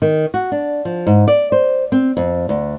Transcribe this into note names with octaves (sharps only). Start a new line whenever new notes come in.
D#3
F#4
D4
F3
G#2
D5
C5
C4
F2
D2